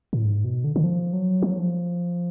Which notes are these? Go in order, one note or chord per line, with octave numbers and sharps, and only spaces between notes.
A2
G#2
B2
D3
D3
F3
F#3
F3
F#3
F3